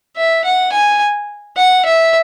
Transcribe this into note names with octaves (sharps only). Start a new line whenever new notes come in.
E5
F#5
G#5
F#5
E5